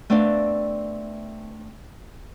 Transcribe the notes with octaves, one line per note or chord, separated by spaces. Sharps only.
A3 B3 C4 D4 D5 F5